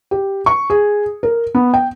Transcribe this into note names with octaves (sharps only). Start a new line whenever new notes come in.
G4
C#6
G#4
A#4
B3
G5